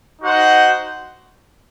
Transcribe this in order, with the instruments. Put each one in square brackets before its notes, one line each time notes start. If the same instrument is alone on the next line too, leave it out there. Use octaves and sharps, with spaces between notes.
[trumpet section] D#4 F#4 C5 F#5